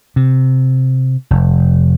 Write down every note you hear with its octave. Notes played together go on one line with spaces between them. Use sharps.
C3
F1